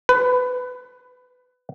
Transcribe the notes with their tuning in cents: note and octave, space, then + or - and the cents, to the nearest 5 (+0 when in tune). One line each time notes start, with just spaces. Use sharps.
B4 +20